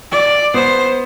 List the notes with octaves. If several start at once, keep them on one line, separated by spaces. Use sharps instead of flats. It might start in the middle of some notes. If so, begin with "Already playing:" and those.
D5
B3 C5